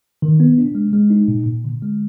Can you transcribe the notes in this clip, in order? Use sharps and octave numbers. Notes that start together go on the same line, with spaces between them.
D#3
B3
D4
G#3
G#3
D#4
A#2
A#2
D3
G#3